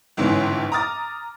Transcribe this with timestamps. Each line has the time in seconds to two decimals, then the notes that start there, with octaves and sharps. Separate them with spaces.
0.17 G1 C#2 G#2 E3 C#4
0.72 A#5 D6 D#6 F6 A6